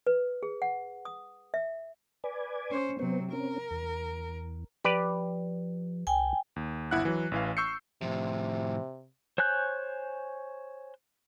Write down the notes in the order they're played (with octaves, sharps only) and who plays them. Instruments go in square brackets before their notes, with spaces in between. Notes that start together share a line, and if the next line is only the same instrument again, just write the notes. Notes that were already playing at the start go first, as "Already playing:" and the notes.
[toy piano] B4
G#4
F#5
D#6
E5
[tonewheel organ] B4 D5 G#5
[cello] C#4 C5
[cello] C3 F#3 [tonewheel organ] B3 C5
[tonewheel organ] C4 C#4 [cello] A#4
[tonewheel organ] E2
[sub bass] F3 [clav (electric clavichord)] G4 B4 D5
[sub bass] C2 [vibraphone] G5 G#5
[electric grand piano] D#2
G1 E4 F#5 F#6
E3 F#3
A1 E3 F5
C#6 E6 G6 C7 C#7
[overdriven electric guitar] A2 F3 [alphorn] C3
[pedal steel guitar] C5 C#5 G#5 F#6 G6